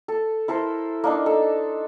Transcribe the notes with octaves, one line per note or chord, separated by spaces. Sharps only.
A4
E4 A4 A#4 C5
A#3 D4 D#4
A4